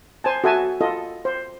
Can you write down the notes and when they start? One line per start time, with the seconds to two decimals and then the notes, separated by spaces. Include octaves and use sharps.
0.24 C5 G#5 A5
0.44 F#4 A4 E5 G#5 A5
0.81 F4 A4 D#5
1.25 C5